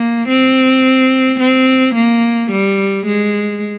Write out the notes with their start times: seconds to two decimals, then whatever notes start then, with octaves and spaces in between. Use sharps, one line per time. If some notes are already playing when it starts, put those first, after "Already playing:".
Already playing: A#3
0.29 C4
1.40 C4
1.95 A#3
2.52 G3
3.07 G#3